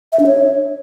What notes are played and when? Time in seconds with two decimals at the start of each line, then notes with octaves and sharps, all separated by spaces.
0.12 E5
0.20 D4
0.27 C#5